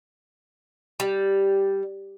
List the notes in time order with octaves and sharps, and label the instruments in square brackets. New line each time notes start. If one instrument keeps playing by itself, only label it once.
[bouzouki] G3